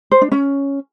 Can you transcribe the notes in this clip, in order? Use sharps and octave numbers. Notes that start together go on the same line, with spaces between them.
C5
D4
C#4